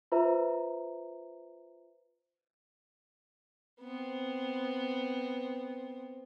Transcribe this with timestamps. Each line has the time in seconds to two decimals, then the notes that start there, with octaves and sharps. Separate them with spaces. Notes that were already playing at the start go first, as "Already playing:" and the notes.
0.12 F4 B4 C5 E5 A#5
3.81 B3 C4